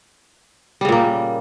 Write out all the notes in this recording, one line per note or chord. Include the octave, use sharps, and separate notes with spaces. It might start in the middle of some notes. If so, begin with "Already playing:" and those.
A#2 C#3 G3 A#3